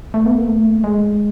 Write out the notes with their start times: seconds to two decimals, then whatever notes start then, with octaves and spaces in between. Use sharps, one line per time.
0.14 A3
0.26 B3
0.37 A#3
0.48 A3
0.84 G#3